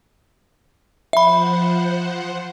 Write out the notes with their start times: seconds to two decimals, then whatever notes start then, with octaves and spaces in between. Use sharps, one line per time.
1.13 F3 C5 E5 F#5 B5